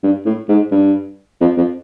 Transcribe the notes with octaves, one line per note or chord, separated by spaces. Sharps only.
G2
A2
G#2
G2
F2
F2